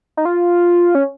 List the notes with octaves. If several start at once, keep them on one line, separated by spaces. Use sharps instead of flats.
D#4
F4
C#4